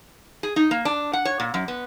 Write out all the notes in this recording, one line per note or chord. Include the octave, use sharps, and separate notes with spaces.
G#4
D#4
A#3
D4
F#5
C#5
A#2
F#2
B3